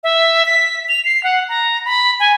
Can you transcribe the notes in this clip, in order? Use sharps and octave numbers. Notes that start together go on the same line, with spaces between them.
E5
B6
F7
C7
F#5
A#5
B5
G#5